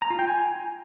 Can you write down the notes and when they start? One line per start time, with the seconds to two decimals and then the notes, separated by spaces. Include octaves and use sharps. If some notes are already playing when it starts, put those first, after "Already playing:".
0.02 A#5
0.10 F4
0.19 G5
0.27 G#5